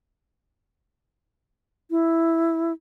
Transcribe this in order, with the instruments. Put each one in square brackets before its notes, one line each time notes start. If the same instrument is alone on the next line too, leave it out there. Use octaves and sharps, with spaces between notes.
[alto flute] E4